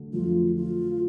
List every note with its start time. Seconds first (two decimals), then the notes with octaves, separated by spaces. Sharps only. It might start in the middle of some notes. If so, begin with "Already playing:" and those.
Already playing: D3 F#3 A3
0.13 F2 D3 F#3 A3 F4
0.56 F4